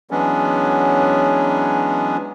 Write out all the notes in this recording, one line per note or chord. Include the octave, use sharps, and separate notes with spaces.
E3 F#3 G#3 B3 C#4 D4